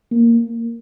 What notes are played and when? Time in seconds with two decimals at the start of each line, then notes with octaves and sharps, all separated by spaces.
0.11 A#3